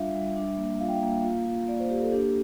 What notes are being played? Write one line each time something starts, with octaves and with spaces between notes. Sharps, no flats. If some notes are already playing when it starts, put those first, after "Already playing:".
Already playing: G3 D4 F4 E5 F5
G3
D4
A#3
F4 F5
G5
F5
A#3
F4
F4
A#3 D5
C5
A#3 G4
A4
D4 G4